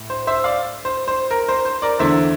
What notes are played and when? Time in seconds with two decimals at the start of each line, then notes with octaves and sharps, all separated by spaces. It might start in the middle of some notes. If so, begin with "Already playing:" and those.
Already playing: A2
0.10 C5
0.27 C5 E5
0.44 D5 F5
0.85 C5
1.08 C5
1.31 A#4
1.48 C5
1.65 C5
1.82 A#4 D5
1.99 E2 D3 A3 D4 C5 E5